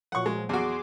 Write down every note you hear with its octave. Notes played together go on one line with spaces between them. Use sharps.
A#2 F3 F#3 F#5 C#6
G#3
E2 F#4 G#4 C6 D6